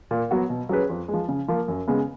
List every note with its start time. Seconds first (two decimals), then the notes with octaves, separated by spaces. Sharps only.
0.11 A#2
0.31 F#3 B3 F#4
0.50 B2
0.69 F#3 C#4 G#4 B4
0.89 F2
1.08 G#3
1.13 F3
1.29 C#3
1.48 F3 A#3
1.68 F#2
1.88 C#3 G#3 B3